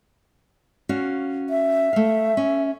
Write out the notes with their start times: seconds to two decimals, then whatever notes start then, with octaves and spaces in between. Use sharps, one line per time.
0.89 C#4 F#4 F5
1.50 E5
1.93 A3 F5
2.37 C#4